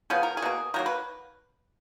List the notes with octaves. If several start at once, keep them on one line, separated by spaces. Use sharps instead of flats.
C#3 F3 B3 G#4
A#4
G#4
B2 A#3
D#3 F#3 A#3 A#4
B4